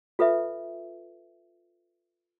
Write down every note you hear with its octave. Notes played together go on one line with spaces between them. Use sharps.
F4 A4 B4 E5